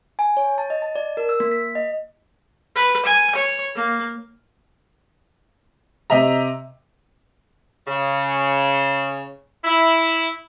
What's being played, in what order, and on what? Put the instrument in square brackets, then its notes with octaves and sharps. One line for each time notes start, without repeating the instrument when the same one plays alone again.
[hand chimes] G#5
C#5
A5
D#5
A5
D5
A#4
E6
A#3
B6
D#5
[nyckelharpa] B4
G#5
C#5
A#3
[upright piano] C3 D#5 E5 A#5
[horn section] C#3
E4